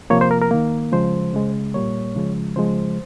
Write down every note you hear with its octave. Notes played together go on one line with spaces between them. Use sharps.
C3 F3 A#3 C#5
C5
A#4
A#4
D#3 A#3
C#3 F3 G#3 C5
C#3 G#3
A#2 G3 A#3 C#5
C#3 F3 G#3
C#3 F3 G#3 C5